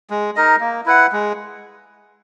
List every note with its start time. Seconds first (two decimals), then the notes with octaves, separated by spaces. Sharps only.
0.10 G#3
0.36 D#4 A#4 D#5
0.61 A#3
0.86 E4 B4 F#5
1.12 G#3